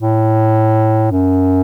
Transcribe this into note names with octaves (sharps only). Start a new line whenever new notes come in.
A2
F#2